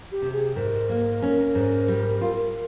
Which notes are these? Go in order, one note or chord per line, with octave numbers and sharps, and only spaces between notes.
G4
C3
G#4
G#2 A#4
A#3
C#4
G#2
G3
F4